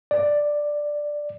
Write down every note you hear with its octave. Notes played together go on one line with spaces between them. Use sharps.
D5